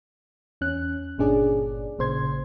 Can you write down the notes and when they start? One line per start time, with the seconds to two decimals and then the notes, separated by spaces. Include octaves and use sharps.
0.61 E2 C#4 F#6
1.18 G1 A#2 C#4 D4 G#4 D5
1.98 A1 A#2 C#3 C5 C6 G#6